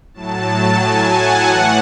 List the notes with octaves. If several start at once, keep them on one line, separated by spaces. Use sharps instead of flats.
A2 F#3 A5
G#5
F#5
A2 E3